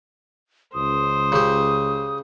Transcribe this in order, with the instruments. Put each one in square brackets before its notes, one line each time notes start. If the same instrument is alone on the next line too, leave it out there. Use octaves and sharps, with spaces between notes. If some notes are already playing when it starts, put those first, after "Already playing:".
[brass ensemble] C#2 [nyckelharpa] C5 [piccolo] D#6
[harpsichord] C#3 G4